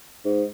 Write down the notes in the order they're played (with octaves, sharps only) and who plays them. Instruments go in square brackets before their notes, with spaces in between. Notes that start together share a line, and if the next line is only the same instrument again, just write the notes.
[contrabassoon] G#2